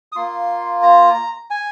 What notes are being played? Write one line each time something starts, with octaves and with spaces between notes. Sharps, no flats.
D#6
A#3 F4 C6
A#5
G#5